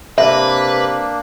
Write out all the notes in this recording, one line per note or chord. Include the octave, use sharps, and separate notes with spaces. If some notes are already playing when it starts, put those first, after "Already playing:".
C3 A#3 D4 B4 E5